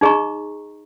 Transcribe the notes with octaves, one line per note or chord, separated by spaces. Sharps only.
D#4 G#4 D#5 A#5 C#6